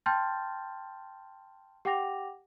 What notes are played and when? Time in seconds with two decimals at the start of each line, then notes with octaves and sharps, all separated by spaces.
0.06 G5 A5 C6 F6 G6 A6
1.85 G4 F#5 G5 D6 A#6 F7